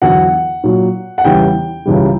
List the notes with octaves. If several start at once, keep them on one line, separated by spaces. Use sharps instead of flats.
E2 D3 F#3 F#5
A#2 F#3
F#5
E2 C#3 E3 G3 G5
C#2 C#3 E3 G3